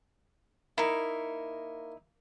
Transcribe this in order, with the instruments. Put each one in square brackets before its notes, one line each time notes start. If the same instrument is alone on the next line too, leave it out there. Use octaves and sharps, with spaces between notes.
[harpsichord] A#3 [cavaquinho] D#4 E4